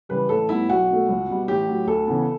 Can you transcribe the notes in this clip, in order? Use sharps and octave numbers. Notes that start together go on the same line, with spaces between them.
C#3 E3 G3 B4
A1 A4
A2 G3 B3 E4
B1 F#4
B2 A3
C#2
B2 G3 B3
A1 G4
A2 F#3
D2 A4
C#3 E3 B3